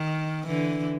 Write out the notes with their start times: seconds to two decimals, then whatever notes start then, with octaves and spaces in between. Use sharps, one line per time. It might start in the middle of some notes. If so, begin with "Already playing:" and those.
Already playing: D#3
0.47 D3 E3